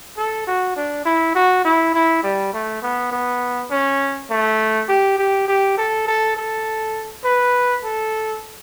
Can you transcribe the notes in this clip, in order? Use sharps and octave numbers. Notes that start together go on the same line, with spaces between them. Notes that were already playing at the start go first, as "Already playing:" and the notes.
A4
F#4
D4
E4
F#4
E4
E4
G3
A3
B3
B3
C#4
A3
G4
G4
G4
A4
A4
A4
B4
A4